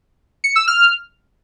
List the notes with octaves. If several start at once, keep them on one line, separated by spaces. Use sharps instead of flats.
C#7
E6
F6